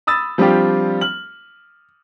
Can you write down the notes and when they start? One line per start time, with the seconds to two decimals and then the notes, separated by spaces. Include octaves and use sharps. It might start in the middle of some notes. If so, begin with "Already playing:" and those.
0.07 B5 D#6 E6 A6
0.38 F3 G3 C4 D4 F4 G4
1.01 F6 F#7